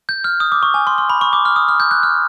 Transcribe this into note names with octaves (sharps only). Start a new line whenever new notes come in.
G6
F6
D#6
D6
C#6
G#5
C6
C6
B5
C#6
D6
F6
D#6
F6
G6
F#6
F6